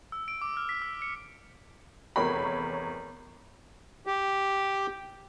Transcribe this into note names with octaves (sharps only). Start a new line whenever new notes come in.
E6
D7
D6
F6
B6
E6
C#7
F1 E2 A#4 C#5 B5
G4